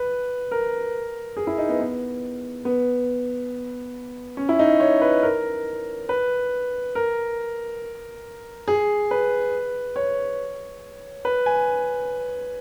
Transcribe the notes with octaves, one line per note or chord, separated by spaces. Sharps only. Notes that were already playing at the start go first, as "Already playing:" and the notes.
Already playing: B4
A#4
G#4
E4
D#4
B3
B3
B3
C#4
E4
D#4
C#5
B4
A#4
B4
A#4
G#4
B4
C#5
B4
G#5